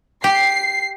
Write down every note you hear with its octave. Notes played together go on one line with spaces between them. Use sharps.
G4 C7